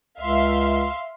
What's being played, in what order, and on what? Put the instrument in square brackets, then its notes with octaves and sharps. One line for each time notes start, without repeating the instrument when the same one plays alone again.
[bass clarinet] C#2 [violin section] E5 F5 C6